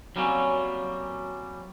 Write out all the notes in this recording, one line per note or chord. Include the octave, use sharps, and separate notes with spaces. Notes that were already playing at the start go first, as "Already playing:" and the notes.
F#3 G3 A#3 C4 C#4